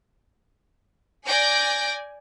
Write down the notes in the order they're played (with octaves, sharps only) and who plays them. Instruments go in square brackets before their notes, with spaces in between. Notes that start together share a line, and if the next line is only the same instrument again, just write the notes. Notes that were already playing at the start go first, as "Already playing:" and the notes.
[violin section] D5 G#5 G6 A#6 D7